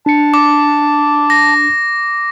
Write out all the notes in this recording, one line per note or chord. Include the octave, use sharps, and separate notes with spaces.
D4 A5 C#7
D6
A#6